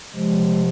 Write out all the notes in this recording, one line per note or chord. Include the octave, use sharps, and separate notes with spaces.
C3 F3 G#3